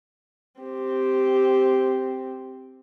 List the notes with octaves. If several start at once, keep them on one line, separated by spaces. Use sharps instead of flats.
C4 G4